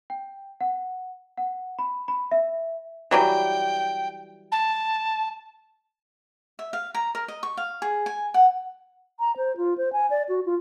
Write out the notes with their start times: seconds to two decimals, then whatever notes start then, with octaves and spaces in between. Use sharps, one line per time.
0.10 G5
0.61 F#5
1.37 F#5
1.79 B5
2.08 B5
2.31 E5
3.11 E3 F#3 G3 G5
4.51 A5
6.59 E5
6.73 F5
6.94 A#5
7.15 A#4
7.28 D#5
7.43 C#6
7.57 F5
7.82 G#4
8.06 G#5
8.34 F#5
9.20 A#5
9.37 C5
9.57 F4
9.78 C5
9.93 G#5
10.10 D5
10.29 F#4
10.46 F4